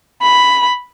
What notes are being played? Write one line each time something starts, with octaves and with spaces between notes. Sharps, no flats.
B5